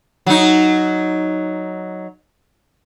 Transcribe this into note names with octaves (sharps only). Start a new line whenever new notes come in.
F#3 D#4